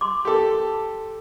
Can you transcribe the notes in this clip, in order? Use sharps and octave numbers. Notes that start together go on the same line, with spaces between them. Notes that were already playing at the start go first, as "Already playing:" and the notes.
C6 D6
G4 A4